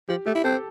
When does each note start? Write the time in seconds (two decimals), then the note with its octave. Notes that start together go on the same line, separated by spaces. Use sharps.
0.09 F3 G4
0.26 A3 G4
0.35 E4
0.44 C4 A4